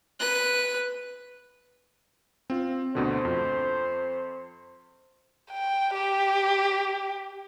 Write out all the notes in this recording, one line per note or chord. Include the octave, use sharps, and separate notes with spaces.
B4 F#6
C4 F4
D2 B2 D3 C5
F2
G5
G4